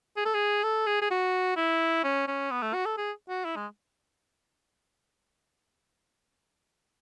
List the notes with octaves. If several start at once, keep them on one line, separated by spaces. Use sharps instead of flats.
G#4
A4
G#4
A4
G#4
G#4
F#4
E4
C#4
C#4
B3
A3
F#4
A4
G#4
F#4
E4
G#3